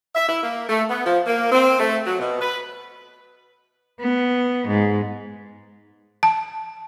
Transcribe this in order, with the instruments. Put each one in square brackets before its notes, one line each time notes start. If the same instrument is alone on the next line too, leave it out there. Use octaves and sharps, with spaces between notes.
[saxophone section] E5
E4
A#3
A3
B3
F3
A#3
C4
A3
F#3
B2
B4
[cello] B3
G#2
[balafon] A5